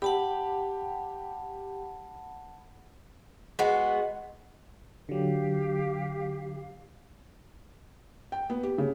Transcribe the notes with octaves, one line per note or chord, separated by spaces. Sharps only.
G4 F#5 A5 B5
G#3 B3 F#4
D3 F#3 G4 F5
G5
B3
G4
C#3